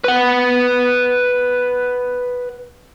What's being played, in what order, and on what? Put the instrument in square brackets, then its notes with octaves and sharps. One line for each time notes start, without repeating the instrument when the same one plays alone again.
[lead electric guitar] B4 F#5